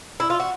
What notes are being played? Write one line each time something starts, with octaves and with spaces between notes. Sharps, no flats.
E4
F4
F#4